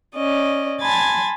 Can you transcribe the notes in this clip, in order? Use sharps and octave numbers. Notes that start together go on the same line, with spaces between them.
C#4 D5 D#5
G#5 A5 B5 C6 G#6 A6